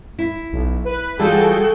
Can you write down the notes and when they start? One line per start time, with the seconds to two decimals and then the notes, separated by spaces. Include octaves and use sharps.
0.19 E4
0.52 B1
0.85 B4
1.19 E3 G3 F4 F#4 G#4 A4 G5